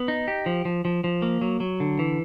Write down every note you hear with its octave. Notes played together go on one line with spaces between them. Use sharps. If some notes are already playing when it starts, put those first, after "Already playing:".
Already playing: B3
D#4
G4
F3
F3
F3
F3
A#3
F#3
F#3
D3
E3